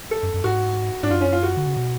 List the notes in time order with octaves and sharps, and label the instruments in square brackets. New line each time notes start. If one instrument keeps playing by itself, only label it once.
[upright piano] A4
[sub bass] F#2
F#2
[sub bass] G#2 [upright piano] F#4
[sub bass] G#2 [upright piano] D4
[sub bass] F#2 [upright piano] F4
[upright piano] C#4
F4
F#4
[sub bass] D3
C#3
B2